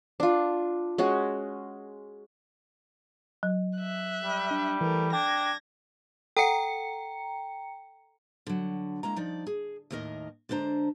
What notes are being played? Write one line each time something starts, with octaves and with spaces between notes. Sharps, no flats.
D4 F4
G#3 C#4 F#4
F#3
E5 F#6
G3
D4
E3 A3 A#4
D4 G5 G#6 A#6
A4 F#5 G5 A#5 C#7
D3 F#3
G#3 A#3 E4 A#5
F3 D#4 D5
G#4
D#2 A2 D#3 A#4 D#5
D3 G#3 D4 C5 A#5